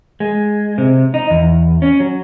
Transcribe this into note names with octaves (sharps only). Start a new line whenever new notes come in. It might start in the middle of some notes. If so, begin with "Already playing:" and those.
G#3
C3
D#4
E2
C#4
F#3